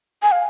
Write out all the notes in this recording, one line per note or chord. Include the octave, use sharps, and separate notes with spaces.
G#5
F5